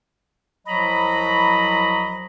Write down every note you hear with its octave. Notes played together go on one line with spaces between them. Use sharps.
C2 F3 F#3 D#5 A#5 B5